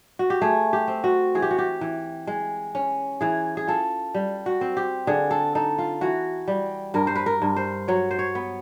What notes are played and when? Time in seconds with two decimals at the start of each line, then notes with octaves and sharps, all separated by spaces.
0.19 F#4
0.30 G4
0.41 A3 G#4
0.73 G4
0.88 C4
1.04 F#4
1.35 E3 G#4
1.42 G4
1.51 F#4
1.58 G4
1.81 E3
2.27 G#3
2.75 C#4
3.21 E3 G#4
3.57 G#4
3.67 F4 A4
4.14 G3
4.46 F#4
4.61 C4
4.77 G4
5.07 D3 G#4
5.31 A4
5.55 D#4 A4
5.78 F4
6.01 E3 F#4
6.48 G3
6.94 G2 A#4
7.07 C5
7.16 B4
7.26 A#4
7.42 G2
7.56 C5
7.88 F#3 C#5
8.11 C5
8.19 C#5
8.35 B3